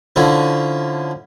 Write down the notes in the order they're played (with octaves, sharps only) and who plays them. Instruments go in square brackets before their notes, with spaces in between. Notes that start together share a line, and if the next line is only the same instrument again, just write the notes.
[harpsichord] D3 F3 C#4 E4